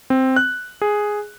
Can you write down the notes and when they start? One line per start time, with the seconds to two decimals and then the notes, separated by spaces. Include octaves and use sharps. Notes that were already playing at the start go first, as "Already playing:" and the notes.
0.10 C4
0.36 F#6
0.82 G#4